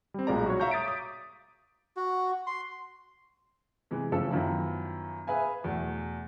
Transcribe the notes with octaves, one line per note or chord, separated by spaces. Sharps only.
G3 C4
B1 A#2 G#3 G#4 D5 A#5
F#4 C#5
C#5 E5 F5 A#5 C#6 G6
D#6 A6 B6 D7
D6 D#6
F#4
C6
C3 E3 G#3
A2 C#3 E3 F3 A4 E6
F#2 D#3 F3 B3 E4
G#4 B4 E5 F5 G#5
E2 B2 A3